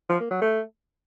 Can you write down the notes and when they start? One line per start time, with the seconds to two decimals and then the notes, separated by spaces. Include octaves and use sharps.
0.10 F3
0.20 A#3
0.31 F#3
0.42 A3